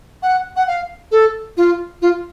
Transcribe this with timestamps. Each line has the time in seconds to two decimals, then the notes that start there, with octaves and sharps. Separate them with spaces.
0.22 F#5
0.56 F#5
0.67 F5
1.11 A4
1.57 F4
2.02 F4